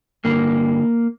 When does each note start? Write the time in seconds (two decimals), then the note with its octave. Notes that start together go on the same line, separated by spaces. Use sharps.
0.24 G2 D3 A#3